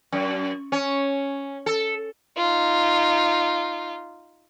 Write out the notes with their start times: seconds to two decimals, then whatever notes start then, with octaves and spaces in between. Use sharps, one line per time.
0.12 F#2
0.72 C#4
1.66 A4
2.37 D#4 F4